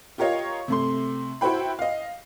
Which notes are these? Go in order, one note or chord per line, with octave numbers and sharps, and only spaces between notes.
F4 G4 A#4 C#5 D#5 F5
C3 A3 C6
E4 F#4 C5 G5 B5
D#5 F5